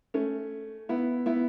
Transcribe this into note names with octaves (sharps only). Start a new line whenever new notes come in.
A3 C#4
B3 E4
B3 E4